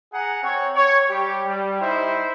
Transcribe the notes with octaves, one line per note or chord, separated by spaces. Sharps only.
G#4 F#5 A#5
C4 C#5
C#5
G3 G4
G3
D#4 E4 C5